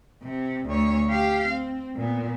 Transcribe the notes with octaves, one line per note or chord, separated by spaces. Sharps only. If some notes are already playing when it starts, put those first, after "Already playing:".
C3
D2 C#5
G4 F5
C4
A#2 B3